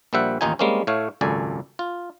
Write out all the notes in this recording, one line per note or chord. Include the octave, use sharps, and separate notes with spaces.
A#1 A#2 G3 C5 E5 F#5
A1 D#2 D#3 D#4 F4 G#5
G3 G#3 A#3 C4 C#4
A2 A3 C#5 F5
G#1 C#2 F#2 A4 D5 G#5
F4